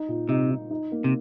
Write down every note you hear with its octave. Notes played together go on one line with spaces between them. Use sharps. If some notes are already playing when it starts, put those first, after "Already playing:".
Already playing: D#4
A#2
C3 D#4
D#4
D#4
A#3
C3